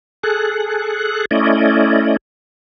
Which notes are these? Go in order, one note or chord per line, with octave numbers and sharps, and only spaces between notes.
G#4 A4 F#6
A3 C#4 E4 D5 D#5